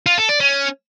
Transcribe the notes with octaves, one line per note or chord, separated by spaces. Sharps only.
F4
A4
D5
C#4